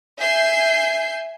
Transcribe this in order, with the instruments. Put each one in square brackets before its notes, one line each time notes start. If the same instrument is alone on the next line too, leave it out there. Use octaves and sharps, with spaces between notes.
[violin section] E5 G#5 G6 C7